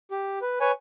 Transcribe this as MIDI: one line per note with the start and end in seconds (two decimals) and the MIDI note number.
0.11 0.39 67
0.42 0.60 71
0.60 0.72 71
0.60 0.72 73
0.60 0.72 80